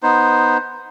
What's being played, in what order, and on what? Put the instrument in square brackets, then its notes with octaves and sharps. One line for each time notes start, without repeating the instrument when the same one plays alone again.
[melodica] B3 D#4 C5